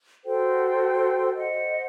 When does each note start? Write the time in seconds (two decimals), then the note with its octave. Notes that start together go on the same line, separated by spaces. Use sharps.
0.24 F#4 A4 C5 G5
1.32 C5 D#5 F#5